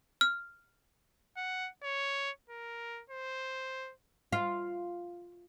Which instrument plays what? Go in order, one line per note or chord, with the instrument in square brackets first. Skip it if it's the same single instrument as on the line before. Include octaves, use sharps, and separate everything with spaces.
[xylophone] F6
[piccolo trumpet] F#5
C#5
A#4
C5
[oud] F4